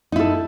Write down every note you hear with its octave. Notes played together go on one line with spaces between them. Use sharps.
D#4 E4 A4